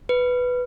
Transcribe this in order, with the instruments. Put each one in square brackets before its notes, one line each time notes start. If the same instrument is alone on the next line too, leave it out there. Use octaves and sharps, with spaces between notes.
[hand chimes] B4